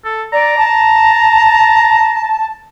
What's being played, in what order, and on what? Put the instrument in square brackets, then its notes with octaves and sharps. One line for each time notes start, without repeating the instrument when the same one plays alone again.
[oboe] A4
[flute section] D5 [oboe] A#5
[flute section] A5